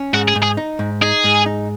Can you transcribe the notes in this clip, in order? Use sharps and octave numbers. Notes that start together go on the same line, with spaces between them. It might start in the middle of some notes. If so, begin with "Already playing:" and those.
Already playing: C#4
G#2 F#4
G#4
G#2
G#4
D#4
G#2
D#4 G#4
G#2
D#4